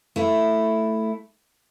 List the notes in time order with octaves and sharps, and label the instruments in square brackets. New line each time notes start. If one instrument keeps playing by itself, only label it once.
[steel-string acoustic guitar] A3 E4